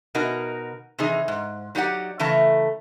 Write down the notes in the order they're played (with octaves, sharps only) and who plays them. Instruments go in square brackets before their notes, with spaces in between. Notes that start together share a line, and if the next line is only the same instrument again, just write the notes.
[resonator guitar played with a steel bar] B2 D#4 F#4 A#4
C3 E3 D#4 G#4
G#2
F#3 D#4 G4 D5 F#5
C#3 E3 A3 A5 A#5